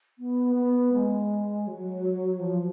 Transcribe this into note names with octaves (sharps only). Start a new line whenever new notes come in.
B3
B3
G#3
F#3
F3